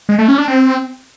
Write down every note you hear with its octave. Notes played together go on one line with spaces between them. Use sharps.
G#3
A3
C#4
D4
C4